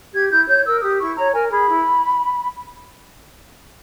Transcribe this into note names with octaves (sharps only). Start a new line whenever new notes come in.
G4 G#6
E4 G6
C#5 G6
A#4 E6
G4 D#6
E4 C#6
C#5 A#5
A#4 G#5
G#4 B5
E4